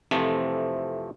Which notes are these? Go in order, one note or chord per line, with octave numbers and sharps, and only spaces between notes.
F2 C3 E3 F3 A3